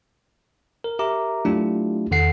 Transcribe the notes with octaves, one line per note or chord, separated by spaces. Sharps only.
A#4
G4 A#4 E5 A#5 D6
F#3 A3 D4 E4 F4 G4
E2 D#3 A4 F#5 C7